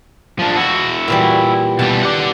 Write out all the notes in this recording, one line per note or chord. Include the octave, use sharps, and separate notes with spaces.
F3 D4
E4 F#4
A#2 E3 G3
B2 G3 A5
D5 F#5